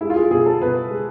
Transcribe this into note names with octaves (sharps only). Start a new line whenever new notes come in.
G#3 E4
F4
G#4
B2 G#4
A4
B2 B4
G#3